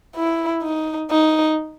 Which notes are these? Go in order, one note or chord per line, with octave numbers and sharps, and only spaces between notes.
E4
D#4
D#4